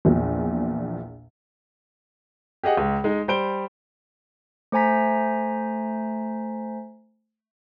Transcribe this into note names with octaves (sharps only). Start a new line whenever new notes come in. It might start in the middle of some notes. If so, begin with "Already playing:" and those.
A#1 E2 A#2
G4 G#4 D#5 F#5
C#2
G#3 D#4
G3 C5 D7 G7
A3 C5 G#5 A#5 B6